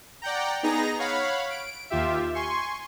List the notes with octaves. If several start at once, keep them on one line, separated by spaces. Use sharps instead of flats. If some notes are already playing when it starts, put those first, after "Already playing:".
D5 F#5 G5 A#5
B3 D#4 G#4 A#5 A#6
C#5 F5 F#5 B5
D7
D#2 F4 G4 E5
G#5 C6 C#6